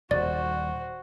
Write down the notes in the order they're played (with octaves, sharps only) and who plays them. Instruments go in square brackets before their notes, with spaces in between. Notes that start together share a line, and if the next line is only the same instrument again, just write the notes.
[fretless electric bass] D#1 [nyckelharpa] F#4 C5 [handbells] D5